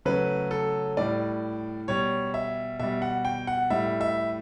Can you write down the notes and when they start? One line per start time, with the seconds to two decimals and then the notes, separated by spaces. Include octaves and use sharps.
0.05 C#3 F#3 A3 B4
0.51 A4
0.97 A2 G3 D5
1.88 B2 G3 C#5
2.34 E5
2.80 B2 G3 E5
3.02 F#5
3.25 G5
3.47 F#5
3.70 A2 G3 E5
4.01 E5